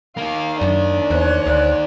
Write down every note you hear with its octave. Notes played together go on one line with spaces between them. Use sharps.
A#3 D#4 F5
F#2 D4
E2 C5 C#5 F#6
D2 D5